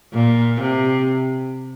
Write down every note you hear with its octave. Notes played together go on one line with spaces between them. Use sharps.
A#2
C3